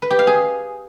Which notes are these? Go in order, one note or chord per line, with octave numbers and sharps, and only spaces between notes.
B4
G4
F5
G#4